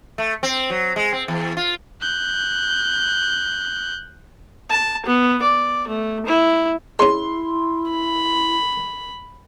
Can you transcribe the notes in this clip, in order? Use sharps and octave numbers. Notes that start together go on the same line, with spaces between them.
A3
C4
F#3
G#3
C4
E2
F4
F#6 G6
A5
B3
D5
A3
E4
G#3 C#4 E4 C6
B5